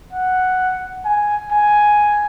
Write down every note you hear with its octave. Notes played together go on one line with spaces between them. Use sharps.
F#5
G#5
G#5